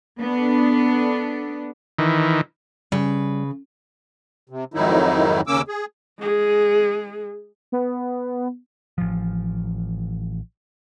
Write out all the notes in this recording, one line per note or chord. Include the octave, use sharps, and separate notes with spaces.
B3 D4 A4
D#3 E3
C#3 G3 B4
C3
F2 G#2 D#3 F#3 D#4 E4
D#2 C#3 A#3 C#4 D6 E6
G#4
G#3 G#4
B3
A1 F3